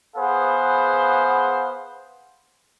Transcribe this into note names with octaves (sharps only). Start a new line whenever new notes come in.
B3 G#4 B4 C5 F5 F#5